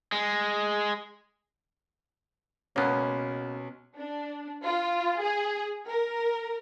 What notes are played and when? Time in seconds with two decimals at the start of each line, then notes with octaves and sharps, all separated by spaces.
0.12 G#3
2.76 C#2 B2 A#3 B3 C#4
3.98 D4
4.65 F4
5.21 G#4
5.89 A#4